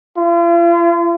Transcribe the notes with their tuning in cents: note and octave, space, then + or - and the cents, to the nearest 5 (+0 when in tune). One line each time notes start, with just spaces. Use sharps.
F4 -40